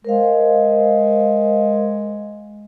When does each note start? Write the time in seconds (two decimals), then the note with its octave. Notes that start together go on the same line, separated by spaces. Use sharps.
0.05 G#3 A#4 C5 F5